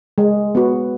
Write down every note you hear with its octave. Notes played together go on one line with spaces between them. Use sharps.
G#3
B3 F#4